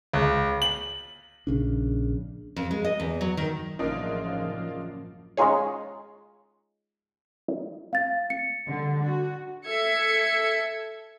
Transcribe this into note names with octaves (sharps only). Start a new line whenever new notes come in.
C#2
F#7
A#1 C#3 D4
F2
G#3
D#5
E2
F#3
D#3
A1 F#2 C#3 F3 A#3 D4 D#4 F4
G#3 C#4 D#4 F4 G#4 C#5
F5 A6
C#7
D3 G3
F#4
A4 E5 G#6 C#7